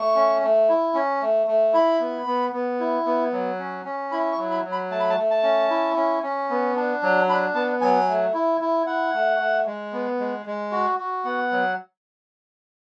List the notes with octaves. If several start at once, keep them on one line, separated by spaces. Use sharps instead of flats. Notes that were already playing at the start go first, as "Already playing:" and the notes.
Already playing: A3 C#6
C#4
A3
E4
C#4
A3
A3
E4 B5
B3
B3
B3
E4
B3
F#3
C#4
C#4
E4 B5
C#6
F#3
B5
F#3
B5
A3 A5
B5
A5
A3
A5
C#4
E4
C#4
C#4
B3
D4
F#3
D4 B5
B3 A5
F#3 G#5
A3
E4
E4
E4 F#5
A3
A3
G#3
B3
G#3
G#3
F#4
F#4
B3 F#5
F#3